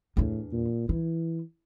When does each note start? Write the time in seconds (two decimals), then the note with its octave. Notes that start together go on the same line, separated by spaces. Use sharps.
0.17 E2 A2 D4
0.52 A#2
0.89 E3 E4